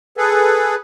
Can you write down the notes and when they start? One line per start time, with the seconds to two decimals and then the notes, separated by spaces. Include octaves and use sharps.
0.17 G#4 A4 B4